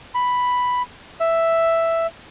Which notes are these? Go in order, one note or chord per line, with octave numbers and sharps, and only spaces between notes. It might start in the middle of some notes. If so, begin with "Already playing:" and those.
B5
E5